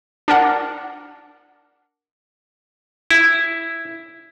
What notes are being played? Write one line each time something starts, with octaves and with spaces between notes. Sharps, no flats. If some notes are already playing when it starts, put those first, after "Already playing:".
D4 A#4 F#5
E4